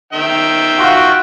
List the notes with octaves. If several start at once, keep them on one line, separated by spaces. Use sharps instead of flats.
D#3 E5 G5
F4 F#4